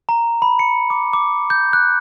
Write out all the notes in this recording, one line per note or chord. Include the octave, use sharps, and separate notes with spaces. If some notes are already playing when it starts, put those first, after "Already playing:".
A#5
B5
C#7
D6
D6
G6
F#6